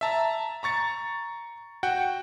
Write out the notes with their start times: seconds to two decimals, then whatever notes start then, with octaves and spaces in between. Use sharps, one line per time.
0.01 E5 A5 A#5
0.63 A#5 C#6 A6 C#7
1.83 F#4 F#5 G5